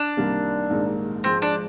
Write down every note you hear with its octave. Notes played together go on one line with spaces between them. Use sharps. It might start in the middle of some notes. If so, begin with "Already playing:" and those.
Already playing: D4
C2 C3 D#3 G3 A#3
A#1 G#2 D#3 A#3 D#4
G#2 F3 G#3 C4
D4